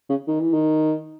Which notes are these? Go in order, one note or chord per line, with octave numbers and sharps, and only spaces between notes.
C#3
D#3
E3
D#3